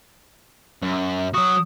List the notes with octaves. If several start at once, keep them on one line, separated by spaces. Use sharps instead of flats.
F#2
F#3 F#4 D#6